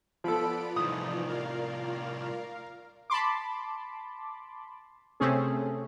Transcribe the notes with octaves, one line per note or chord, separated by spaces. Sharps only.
F3 B3 F4 A4 D5 B5 D7
C2 A2 E3 F3 D#4 D#6
A#4 F5
A5 B5 C6 D6
C3 A3 C4 C#4 G#4